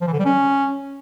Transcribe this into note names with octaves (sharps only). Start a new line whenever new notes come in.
F3
E3
D3
G3
C#4